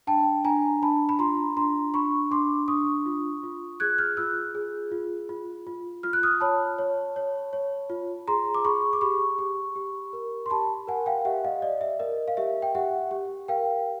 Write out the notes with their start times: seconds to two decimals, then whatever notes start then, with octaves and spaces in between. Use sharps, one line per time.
0.07 D4 G5 A5
0.44 D4 G#5 A#5
0.82 D4 A5 B5
1.09 B5
1.19 F4 A#5 C6
1.56 D4 A#5 C6
1.94 D4 B5 C#6
2.31 D4 C6 D6
2.68 D4 C#6 D#6
3.06 F4
3.43 F4
3.80 G#4 F#6 G#6
3.98 F6 G6
4.17 F4 E6 F#6
4.55 G#4
4.92 F4
5.29 F4
5.67 F4
6.03 F4 F6
6.13 F#6
6.23 D#6 F6
6.40 C#5 A5 B5
6.78 C#5
7.16 C#5
7.53 C#5
7.90 F4
8.28 G#4 A#5 C6
8.54 D6
8.65 G#4 B5 C#6
8.93 D6
9.01 G4 B5 C#6
9.39 G4
9.76 G4
10.13 A#4
10.46 C6
10.50 G4 A5 B5
10.87 A#4 F#5 G#5
11.06 F5 G5
11.25 G4 E5 F#5
11.45 D#5 F5
11.62 D5 D#5
11.81 E5
12.00 A#4 D#5
12.28 F5
12.37 G4 E5
12.62 G5
12.75 G4 E5 F#5
13.11 G4
13.48 A#4 F5 G5